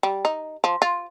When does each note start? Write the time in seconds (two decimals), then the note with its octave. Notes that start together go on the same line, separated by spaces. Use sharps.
0.03 G3
0.25 D#4
0.64 F3
0.82 F4